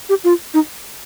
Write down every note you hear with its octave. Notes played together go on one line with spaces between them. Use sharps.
G4
F4
D#4